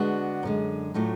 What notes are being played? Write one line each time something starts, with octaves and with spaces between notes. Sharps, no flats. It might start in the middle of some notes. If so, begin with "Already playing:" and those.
Already playing: D3 G#3 B3 D4 F#4
F#2 D3 G#3
A2 F#3 A3 D4 F4